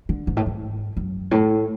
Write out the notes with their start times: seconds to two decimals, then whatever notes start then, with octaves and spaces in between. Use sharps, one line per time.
0.09 D3
0.27 G#2
0.37 A2
0.46 G#2
0.97 F#2
1.31 A2